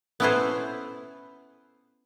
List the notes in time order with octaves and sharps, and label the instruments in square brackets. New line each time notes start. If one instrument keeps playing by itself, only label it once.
[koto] B3 C#4 E4 A4 B4 C5